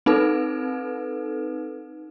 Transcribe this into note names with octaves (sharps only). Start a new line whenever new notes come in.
C4 D#4 A4 B4